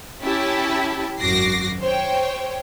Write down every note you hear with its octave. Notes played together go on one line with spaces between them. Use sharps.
C#4 E4 G4 G5 A5 B5
G#1 F#2 F#4 D6 A#6 C7
C5 C#5 G5